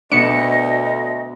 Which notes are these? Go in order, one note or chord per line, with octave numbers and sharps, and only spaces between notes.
D2 B2 B3 D4 D#5 C#7